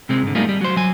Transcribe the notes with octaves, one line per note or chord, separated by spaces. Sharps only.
C3 G#3 C4
G#2 D3
G3 A3 A#3 D#4 F4 G#4
G3
F#3 C5
F#3 G#5